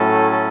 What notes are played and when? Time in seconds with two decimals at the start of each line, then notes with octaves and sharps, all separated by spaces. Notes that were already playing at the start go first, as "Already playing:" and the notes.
Already playing: A2 F#3 A3 C#4 A4
0.31 A4